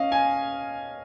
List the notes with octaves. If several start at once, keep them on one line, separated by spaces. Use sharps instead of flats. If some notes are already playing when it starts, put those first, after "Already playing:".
Already playing: C#4 D#5 F5
G#5